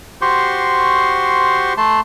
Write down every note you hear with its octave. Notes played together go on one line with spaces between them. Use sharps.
F#4 G4 C5 C6 C#6
A3 A5 C6